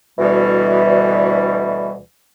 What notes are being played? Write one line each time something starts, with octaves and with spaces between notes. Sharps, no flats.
D2 B2 E3 G3